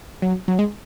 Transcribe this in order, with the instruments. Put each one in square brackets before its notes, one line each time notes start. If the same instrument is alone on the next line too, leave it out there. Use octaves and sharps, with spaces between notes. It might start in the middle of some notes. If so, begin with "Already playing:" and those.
[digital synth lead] F#3
F#3
G#3